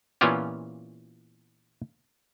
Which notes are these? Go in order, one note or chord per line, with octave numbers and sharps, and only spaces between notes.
A#2 E3 B3 C#4 F4 G4